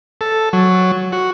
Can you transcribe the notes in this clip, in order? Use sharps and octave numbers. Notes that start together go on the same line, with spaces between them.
A4
F#3
F#4